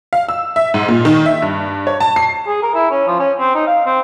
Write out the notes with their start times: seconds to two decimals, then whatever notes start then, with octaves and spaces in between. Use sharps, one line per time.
0.13 F5
0.29 E6
0.56 E5
0.74 G#2
0.88 A#2
1.05 D#3
1.26 E5
1.42 G2
1.87 C#5
2.00 A5
2.16 C7
2.47 G#4
2.63 A#4
2.75 E4
2.91 C#4
3.07 F3
3.19 C#4
3.38 C4
3.54 D#4
3.67 F5
3.86 C4